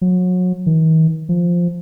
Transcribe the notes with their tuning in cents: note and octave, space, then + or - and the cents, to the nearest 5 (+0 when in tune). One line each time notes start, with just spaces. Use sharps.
F#3 -30
D#3 +45
F3 +0